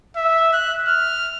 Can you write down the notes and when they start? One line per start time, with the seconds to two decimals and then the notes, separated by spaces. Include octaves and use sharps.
0.16 E5
0.53 F#6
0.88 F6